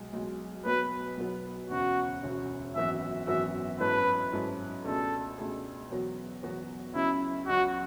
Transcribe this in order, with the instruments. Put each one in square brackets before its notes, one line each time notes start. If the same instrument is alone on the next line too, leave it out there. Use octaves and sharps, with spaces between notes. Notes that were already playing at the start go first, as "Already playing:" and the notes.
Already playing: [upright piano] B1 B2 G#3
B1 B2 G#3
[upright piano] B1 B2 F#3 B3 [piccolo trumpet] B4
[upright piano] B1 B2 F#3 B3
[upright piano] E1 D2 C#3 [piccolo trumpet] F#4
[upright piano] E1 D2 C#3
[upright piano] G#1 F#2 E3 B3 F#4 [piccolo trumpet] E5
[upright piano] G#1 F#2 E3 B3 F#4 [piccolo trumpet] E5
[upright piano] G#2 F#3 C#4 E4 A4 [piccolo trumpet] B4
[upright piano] G#2 F#3 C#4 E4 A4
[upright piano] C#2 B2 A3 D4 G#4 [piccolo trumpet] A4
[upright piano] C#2 B2 A3 D4 G#4
E2 B2 F#3 B3 F#4
E2 B2 F#3 B3 F#4
[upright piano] C#2 C#3 F#3 [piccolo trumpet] E4
[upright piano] C#2 C#3 F#3 [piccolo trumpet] F#4